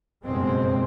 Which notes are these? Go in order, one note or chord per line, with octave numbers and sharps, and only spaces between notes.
F#1 G2 B2 G#3 C4